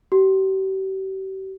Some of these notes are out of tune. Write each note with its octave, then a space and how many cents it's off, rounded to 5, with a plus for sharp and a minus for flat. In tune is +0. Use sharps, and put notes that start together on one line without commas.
G4 -40